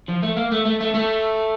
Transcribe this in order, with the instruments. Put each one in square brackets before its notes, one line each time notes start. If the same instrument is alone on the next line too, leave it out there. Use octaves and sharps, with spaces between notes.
[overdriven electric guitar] F3
A3
A#3
A3
A3
A3
A3